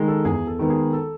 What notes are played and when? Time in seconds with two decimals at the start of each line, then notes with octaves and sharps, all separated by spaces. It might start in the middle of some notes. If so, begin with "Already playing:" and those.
Already playing: D#3 G#3
0.08 A4
0.25 E2 G#4
0.47 A4
0.59 D#3 G#3 B3
0.70 G#4
0.93 A4